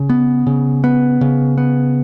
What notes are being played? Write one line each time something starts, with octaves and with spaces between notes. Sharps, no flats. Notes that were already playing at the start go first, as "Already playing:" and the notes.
Already playing: C#3
B3
C#3
B3
C#3
B3